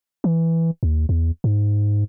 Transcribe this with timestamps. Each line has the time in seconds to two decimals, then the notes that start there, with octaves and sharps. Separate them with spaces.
0.24 E3
0.83 D#2
1.09 E2
1.44 G#2